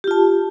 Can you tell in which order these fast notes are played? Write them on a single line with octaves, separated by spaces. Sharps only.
G4 F4 A5